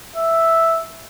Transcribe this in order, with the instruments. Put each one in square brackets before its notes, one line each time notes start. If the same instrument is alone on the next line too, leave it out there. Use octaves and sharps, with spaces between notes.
[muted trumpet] E5